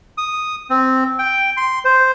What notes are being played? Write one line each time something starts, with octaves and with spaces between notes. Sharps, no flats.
D#6
C4
G5
C6
C5